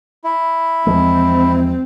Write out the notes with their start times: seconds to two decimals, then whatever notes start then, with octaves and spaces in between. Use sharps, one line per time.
0.24 E4
0.87 E2 F3 G#3 C4